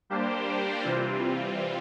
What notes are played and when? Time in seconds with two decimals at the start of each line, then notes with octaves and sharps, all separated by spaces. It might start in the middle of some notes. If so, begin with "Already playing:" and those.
0.10 G3 A#3 D4 G4 C5
0.83 C3 E3 G3 C4 F4